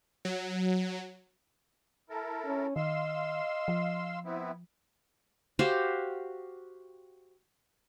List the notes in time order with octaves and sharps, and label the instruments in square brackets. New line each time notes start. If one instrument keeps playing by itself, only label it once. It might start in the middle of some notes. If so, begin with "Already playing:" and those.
[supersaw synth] F#3
[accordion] E4 A4 A#4
[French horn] C#4
[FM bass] D#3 [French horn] D#5 [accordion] F5 C6 E6
[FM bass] F3
[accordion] B3 C4 E4
[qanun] F#4 G4 C5 F5